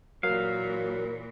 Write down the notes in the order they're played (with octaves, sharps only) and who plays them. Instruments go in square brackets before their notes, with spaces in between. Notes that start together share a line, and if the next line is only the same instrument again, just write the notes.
[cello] A#2 E3 [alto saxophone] F#3 [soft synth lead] A#4 [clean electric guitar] F5